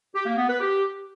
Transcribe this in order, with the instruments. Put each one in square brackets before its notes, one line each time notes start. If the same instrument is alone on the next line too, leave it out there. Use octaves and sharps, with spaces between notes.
[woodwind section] G4
A#3
B3
B4
G4